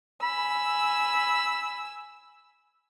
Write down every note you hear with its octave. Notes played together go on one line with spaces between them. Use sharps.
G#5 B5 E6